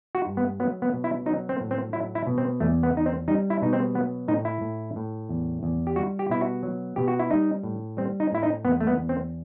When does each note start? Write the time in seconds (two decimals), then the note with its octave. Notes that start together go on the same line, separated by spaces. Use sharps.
0.15 F#4
0.26 G2
0.37 B3
0.60 F#3 B3
0.82 B3
0.93 B2
1.04 E4
1.26 F#3 D#4
1.49 C4
1.61 A2
1.71 C4
1.93 F#3 E4
2.15 E4
2.27 B2
2.38 C4
2.60 E2 A3
2.83 B3
2.95 E2 D#4
3.06 C4
3.28 G3 D#4
3.50 E4
3.62 B2 D#4
3.73 C4
3.95 F#3 B3
4.28 A2 D#4
4.45 E4
4.62 A2
4.96 A2
5.29 E2
5.63 E2
5.87 G4
5.96 G3 F#4
6.19 G4
6.30 B2 E4
6.41 F#4
6.63 F#3
6.96 B2 G4
7.08 F#4
7.19 E4
7.31 G3 D#4
7.63 A2
7.97 G3 C4
8.20 D#4
8.32 A2 E4
8.43 D#4
8.65 E2 B3
8.80 A3
8.87 B3
8.98 E2
9.09 C4